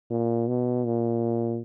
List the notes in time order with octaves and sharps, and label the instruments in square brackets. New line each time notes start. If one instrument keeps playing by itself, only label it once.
[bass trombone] A#2
B2
A#2